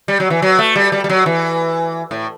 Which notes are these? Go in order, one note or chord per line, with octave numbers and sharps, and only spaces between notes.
G3
F#3
E3
F#3
A3
G3
G3
G3
F#3
E3
A2